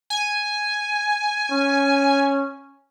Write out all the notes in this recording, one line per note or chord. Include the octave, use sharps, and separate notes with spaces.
G#5
C#4